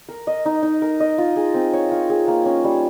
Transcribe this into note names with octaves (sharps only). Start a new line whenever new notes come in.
A#4
D#5
D#4
D#4
A#4
D#5
F4
G#4
C4
C#5
F4
G#4
A#3
C#4
G3